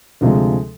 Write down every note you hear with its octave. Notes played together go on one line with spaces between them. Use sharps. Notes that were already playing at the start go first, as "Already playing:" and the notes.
D2 C3 F3 G#3